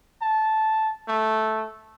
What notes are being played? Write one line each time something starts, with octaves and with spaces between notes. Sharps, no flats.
A5
A3